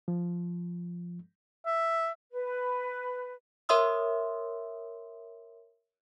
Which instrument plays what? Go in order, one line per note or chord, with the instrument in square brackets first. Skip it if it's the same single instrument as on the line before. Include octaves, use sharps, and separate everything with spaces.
[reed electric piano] F3
[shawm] E5
[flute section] B4
[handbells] A#4 C#5 E5 C6 D#6 E6